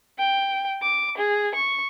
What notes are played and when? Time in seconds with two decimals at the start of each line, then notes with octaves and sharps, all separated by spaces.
0.18 G5
0.82 D6
1.17 G#4
1.55 C#6